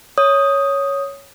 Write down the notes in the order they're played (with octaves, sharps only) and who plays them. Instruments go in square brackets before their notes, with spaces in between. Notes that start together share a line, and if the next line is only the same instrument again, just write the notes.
[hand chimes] C#5 D#6